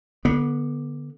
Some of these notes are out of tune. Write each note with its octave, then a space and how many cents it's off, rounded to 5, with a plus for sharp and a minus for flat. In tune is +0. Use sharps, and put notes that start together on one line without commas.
D3 +0 B3 -25